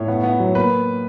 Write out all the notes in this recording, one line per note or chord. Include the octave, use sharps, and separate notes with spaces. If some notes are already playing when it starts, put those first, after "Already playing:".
Already playing: A2 C#5
B3
B3
F#3
A#3 B4